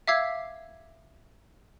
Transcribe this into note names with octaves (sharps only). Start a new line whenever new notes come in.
E5 F5 D6 E6 G#6 C7